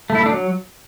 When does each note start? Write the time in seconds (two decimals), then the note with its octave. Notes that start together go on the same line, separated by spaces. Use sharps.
0.10 A3
0.15 E4
0.20 A3
0.26 D4
0.31 F#3